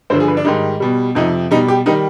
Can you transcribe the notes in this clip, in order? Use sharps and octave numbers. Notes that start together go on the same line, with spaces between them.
G2 D3 F3 C5
G#4
B4
D4
G#2 D#3 G3 D#4
B2 G3
F2 C3 F3 D#4
B2 G3 D#4
G4
D#3 G3 D#4